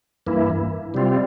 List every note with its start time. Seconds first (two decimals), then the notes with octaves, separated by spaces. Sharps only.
0.27 G2 E3 A#3 E4
0.94 C3 G3 C4 F4